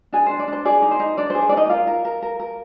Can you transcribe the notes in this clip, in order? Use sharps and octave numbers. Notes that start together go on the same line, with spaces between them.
D4 G#4 G#5
D4 C5
D5
D4 C5
G#4 D5
D#4
C5
D#4
D4 D5
C5
G#4
C5
D5
D4
D#4 D#5
F4 A#4 F5
A#4
A#4
A#4
A#4